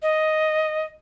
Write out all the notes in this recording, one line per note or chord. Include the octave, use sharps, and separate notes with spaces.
D#5